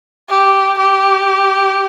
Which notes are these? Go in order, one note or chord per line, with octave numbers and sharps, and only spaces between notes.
G4
G4